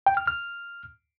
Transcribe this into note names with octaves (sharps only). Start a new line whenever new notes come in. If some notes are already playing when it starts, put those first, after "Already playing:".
G5
F6
F6